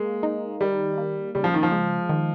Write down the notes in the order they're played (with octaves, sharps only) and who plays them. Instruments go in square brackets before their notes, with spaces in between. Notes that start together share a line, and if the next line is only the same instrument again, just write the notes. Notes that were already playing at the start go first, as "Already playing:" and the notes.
Already playing: [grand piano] G#3 [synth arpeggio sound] A#3
[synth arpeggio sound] D#4
[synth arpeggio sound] D#3 [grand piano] G3
[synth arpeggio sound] A#3
[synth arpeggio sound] C#3 [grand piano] G3
[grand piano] F3
D#3
F3
[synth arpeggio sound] G#3
D#3